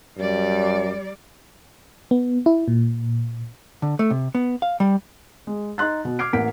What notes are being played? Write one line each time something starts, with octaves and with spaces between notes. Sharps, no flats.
F#2 G3 D5
B3
E4
A#2
D3
A3
C3
B3
F5
G3
G#3
D#4 C6 F#6 A6
B2
D6 F6 G#6 C7 D7
A1 A#3 F#5 B6 D7